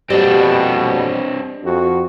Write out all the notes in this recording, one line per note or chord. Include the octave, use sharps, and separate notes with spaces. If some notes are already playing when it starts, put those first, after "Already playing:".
F2 B2 G3 C4 D4 G4 D5 D#5
F2 F#4